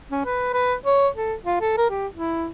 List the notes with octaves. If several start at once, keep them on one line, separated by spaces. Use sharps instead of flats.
C#4
B4
B4
C#5
A4
F4
A4
A#4
G4
E4